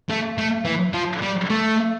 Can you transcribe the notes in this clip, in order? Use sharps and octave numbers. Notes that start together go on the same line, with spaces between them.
A3
A3
E3
F3
G3
A3